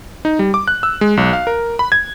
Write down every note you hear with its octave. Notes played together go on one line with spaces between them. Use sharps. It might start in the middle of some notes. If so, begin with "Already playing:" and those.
D#4
G3
D6
F#6
E6
G#3
B1
F5
A#4
B5
G#6